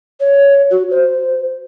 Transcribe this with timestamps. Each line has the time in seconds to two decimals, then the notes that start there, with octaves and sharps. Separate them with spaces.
0.20 C#5
0.71 F#4
0.91 C5